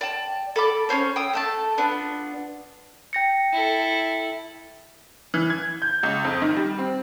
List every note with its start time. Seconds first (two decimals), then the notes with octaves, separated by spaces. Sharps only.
0.01 D5 G5 A5
0.56 A4 B5 D6
0.89 C#4 F4 C5 C#5
1.16 G5 D#6 E6
1.33 A3 A4 A5
1.78 B3 D4 F4
3.13 G5 A#6 C#7
3.53 E4 A4
5.34 E3
5.50 G#6
5.82 G6
6.03 C#2
6.25 F2
6.42 D#3
6.57 G3
6.78 C4